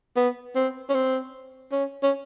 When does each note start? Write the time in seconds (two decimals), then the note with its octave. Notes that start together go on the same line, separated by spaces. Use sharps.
0.16 B3
0.56 C4
0.89 C#4
0.95 C4
1.72 C#4
2.03 C#4